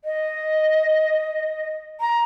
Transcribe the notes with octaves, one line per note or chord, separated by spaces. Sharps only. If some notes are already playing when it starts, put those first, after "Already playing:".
D#5
A#5